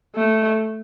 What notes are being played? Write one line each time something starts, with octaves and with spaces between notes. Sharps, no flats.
A3